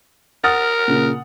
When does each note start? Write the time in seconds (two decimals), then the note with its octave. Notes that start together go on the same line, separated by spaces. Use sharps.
0.44 A#4 F#5 D#6 F6 A6
0.88 A#2 C#3